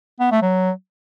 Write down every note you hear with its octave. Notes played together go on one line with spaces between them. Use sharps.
B3
A3
F#3